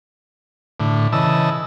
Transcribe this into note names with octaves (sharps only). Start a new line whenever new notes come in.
A2 D3
C#3 E3 D#5 A5 E6